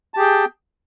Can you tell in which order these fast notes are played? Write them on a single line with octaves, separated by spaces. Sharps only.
A5 G4 G#4 G5